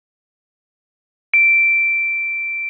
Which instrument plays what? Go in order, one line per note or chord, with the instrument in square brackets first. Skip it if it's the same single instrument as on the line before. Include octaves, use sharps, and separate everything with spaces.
[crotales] D7